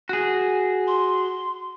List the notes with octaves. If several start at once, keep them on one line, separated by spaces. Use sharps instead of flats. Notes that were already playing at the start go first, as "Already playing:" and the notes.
F#4 G#4
C6